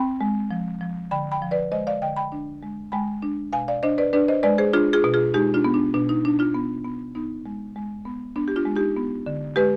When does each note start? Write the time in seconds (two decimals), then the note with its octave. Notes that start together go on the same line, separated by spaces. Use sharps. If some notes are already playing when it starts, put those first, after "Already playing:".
Already playing: C4 G5 B5
0.21 G#3
0.51 F3
0.81 F3
1.11 D3 G5 B5
1.32 G5 B5
1.42 F3
1.51 B4 D5
1.71 G#3 C5 D#5
1.87 D5 F5
2.02 D3 D#5 G5
2.16 G5 B5
2.32 D4
2.63 G#3
2.92 G#3 G5 B5
3.22 D4
3.53 B2 F5 G#5
3.68 D5 F5
3.83 D4 C5 D#5
3.98 B4 D5
4.13 D4 B4 D5
4.28 C5 D#5
4.43 G#3 B4 D5
4.58 G#4 C5
4.73 D4 F4 G#4
4.93 F4 G#4
5.04 B2
5.14 F4 G#4
5.34 G#3 D#4 G4
5.54 D4 F4
5.64 B3
5.74 D4
5.94 B2 D4
6.09 D#4
6.25 B2 D4
6.39 D4 F4
6.54 B3
6.84 B3
7.15 B3 D#4
7.46 G#3
7.76 G#3
8.05 B3
8.36 B3 D4
8.48 G4
8.56 D4 F4
8.66 G#3
8.76 D#4 G4
8.97 B3
9.26 D3
9.56 G#3 G4 B4